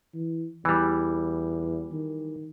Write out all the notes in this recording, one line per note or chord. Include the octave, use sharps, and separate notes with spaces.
E3
E2 E3 G3
D#3